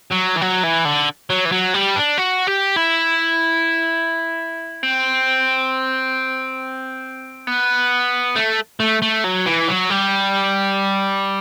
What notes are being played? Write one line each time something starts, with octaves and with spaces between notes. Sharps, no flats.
F#3
E3
F#3
E3
D3
F#3
E3
F#3
G3
D4
F#4
G4
E4
C4
B3
A3
A3
A3
F#3
E3
F#3
G3